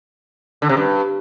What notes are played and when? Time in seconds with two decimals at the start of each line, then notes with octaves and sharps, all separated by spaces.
0.62 D3
0.69 C3
0.77 G2